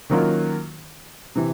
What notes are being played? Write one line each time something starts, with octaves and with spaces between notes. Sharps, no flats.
D#3 F#3 A#3 C#4 F4
C3 E3